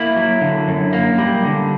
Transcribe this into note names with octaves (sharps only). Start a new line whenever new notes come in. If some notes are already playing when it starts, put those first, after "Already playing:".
Already playing: A#3 E4
F#3
D3
F#2
A#3
G3
D3